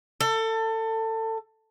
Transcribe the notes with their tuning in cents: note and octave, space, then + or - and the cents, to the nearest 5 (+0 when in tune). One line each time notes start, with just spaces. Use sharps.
A4 +25